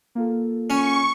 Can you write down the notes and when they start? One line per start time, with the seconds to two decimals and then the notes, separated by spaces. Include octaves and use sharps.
0.15 A#3 F4 A4
0.70 C#4 C#6